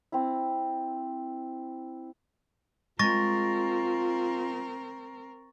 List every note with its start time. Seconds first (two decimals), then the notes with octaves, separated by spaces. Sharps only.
0.12 C4 E4
2.99 G#3 C4 F4 A#4 C#6 A6 A#6